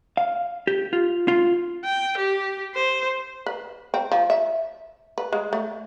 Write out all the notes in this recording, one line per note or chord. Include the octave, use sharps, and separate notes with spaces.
F5
G4
F4
F4
G5
G4
C5
B4
C4
F3
E5
B4
G#3
A3